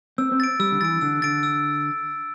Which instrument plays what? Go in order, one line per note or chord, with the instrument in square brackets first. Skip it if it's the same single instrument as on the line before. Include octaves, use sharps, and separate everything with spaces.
[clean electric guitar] C4 [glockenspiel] E6
[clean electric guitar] C4
[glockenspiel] A6 D7
[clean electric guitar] G3 [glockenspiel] E6
[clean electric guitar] D3
[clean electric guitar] E3 [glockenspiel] A6 D7
[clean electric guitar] D3 [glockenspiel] E6
[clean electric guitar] D3 [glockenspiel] A6 D7
[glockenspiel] E6